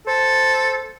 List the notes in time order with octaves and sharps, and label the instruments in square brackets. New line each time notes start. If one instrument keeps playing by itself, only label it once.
[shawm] A4 [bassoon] C5